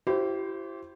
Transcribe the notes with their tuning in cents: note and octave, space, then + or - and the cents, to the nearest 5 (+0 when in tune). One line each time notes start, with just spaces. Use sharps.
E4 +30 G4 -30 C5 +10